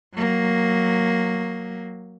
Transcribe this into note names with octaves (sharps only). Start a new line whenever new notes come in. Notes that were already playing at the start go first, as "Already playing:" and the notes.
F#3 A#3